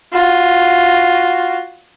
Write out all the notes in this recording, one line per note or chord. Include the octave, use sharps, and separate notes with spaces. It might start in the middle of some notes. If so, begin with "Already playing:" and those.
F4 F#4